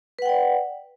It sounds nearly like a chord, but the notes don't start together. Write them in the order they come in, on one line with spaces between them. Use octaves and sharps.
B4 F#5 G5 D5